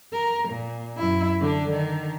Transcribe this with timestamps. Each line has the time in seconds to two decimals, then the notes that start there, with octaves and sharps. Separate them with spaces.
0.13 A#4
0.49 A#2
0.98 F#2 E4
1.41 D3 D4
1.71 D3 D#3